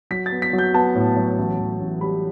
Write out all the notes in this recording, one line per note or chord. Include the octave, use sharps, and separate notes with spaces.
F#3 B6
A6
B3
B6
F#3
G6
B3 A5
A2
F#3
A1
A1
A1
G3 B5